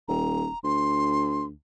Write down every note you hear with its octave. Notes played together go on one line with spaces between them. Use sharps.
D#1 A#5
D2 C6